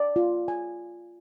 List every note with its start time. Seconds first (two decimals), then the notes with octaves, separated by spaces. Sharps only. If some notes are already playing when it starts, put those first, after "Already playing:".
Already playing: D5
0.16 F4
0.48 G#5